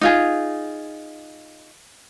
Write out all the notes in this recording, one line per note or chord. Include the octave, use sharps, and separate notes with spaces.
D#4 F4 G#4